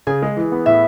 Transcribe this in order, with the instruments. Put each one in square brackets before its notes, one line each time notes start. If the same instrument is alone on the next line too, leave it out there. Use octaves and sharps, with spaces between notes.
[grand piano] C#3 [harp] G#4
[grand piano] G#3
E3
B3
[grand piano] A2 [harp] E5